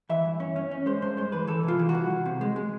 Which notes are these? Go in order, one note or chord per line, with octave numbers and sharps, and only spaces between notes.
E3 E5
G2
C#4
C#4
C#4
G#3 C5
G2 C5
G#3 C5
E3 B4
E3 A4
C3 F4
E3
F#4
C2
C2
C3
G#3
G#3